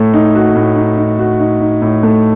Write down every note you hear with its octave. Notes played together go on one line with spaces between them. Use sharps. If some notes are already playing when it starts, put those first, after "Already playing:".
Already playing: A2 A3
D#4
F#4
A2
D#4
D#4
F#4
D#4
D#4
A2
A3